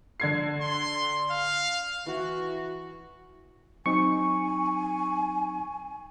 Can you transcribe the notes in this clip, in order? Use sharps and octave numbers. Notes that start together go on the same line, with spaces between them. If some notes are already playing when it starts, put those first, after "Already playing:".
D3 G#6 C7
C6
F5
E3 F#4
F#3 C4 D#4 G#5 C#6